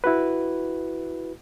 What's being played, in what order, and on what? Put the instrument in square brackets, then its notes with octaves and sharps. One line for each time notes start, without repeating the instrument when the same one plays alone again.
[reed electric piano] E4 F#4 B4